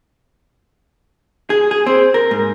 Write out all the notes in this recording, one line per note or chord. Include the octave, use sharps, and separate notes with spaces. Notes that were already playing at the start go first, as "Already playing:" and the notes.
G#4
G#4
C4
A#4
G#2